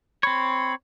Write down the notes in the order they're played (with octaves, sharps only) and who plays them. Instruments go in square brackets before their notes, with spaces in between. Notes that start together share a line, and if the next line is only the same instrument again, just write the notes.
[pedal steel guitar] C4 C#5 [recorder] B5